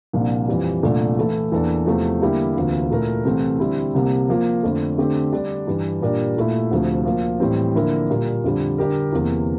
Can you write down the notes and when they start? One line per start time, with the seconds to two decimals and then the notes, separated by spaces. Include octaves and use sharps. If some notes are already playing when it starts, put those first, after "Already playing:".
0.13 C2 A#2 F3 A#3 D4
0.48 F2 E3 G3
0.83 C2 A#2 A3 D4
1.17 E3 A3 E4 A4
1.52 E2 E3 A#3 D4 A4
1.86 E2 C3 F3 A3
2.21 D3 G3 A#3 E4 G4
2.56 D2 C3 E3 A#3 F4
2.90 A#2 A3 E4 A#4
3.25 C2 C3 E3 A3 C4
3.60 D3 G3 C4 E4
3.94 C2 C3 G3 A#3
4.28 F3 A#3 F4
4.63 F2 D3 A3
4.98 D3 A3 C4 G4
5.33 D3 G3 D4
5.67 G2 E3 G3
6.01 A#2 G3 D4 G4 A#4
6.37 A#2 A3 E4
6.71 D2 C3 F3 A3
7.05 F3 A#3 F4
7.40 A2 E3 G3 C4
7.75 D3 F3 A#3 E4 A#4
8.09 A#2 G3 A#3
8.44 F2 D3 G3
8.78 D3 G3 D4 G4 A#4
9.13 E2 C3 E3 A#3